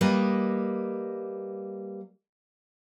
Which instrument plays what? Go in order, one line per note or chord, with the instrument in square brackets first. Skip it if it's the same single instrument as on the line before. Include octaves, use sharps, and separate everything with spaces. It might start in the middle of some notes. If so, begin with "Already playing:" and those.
[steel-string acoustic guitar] G3 A#3 B4 D#5